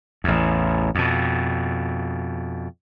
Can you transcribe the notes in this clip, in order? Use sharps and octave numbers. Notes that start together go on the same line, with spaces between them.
A1 E2
F2 B2